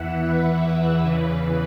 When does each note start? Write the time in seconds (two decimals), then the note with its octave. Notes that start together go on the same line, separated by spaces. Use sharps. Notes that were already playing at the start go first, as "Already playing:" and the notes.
Already playing: E2 E3 E5 F#5
0.25 B4
1.00 E2 C#3 E3